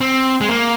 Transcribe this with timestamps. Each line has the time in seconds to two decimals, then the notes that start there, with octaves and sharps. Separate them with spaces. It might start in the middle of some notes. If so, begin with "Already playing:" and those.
0.01 C4
0.41 G#3
0.49 A#3